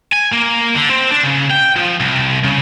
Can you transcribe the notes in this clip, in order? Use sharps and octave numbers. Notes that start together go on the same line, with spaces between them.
G#5
A#3
D3
C4
D4
C#3
G5
F3
C2
C#3